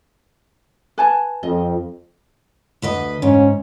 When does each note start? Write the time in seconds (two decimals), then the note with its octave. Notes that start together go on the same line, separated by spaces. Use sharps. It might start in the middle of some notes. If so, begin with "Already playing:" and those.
0.98 B4 G#5 A5
1.43 F2 D#5
2.82 D2 B4 D#5
3.22 G#2 C#4